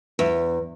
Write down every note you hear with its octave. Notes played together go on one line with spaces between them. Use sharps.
E2